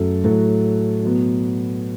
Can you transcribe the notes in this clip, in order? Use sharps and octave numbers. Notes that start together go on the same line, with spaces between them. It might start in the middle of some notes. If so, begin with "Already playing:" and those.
Already playing: F#2 F#3 A3 A4
A2 F#3 A3 F#4 A4
B2 F#3 B3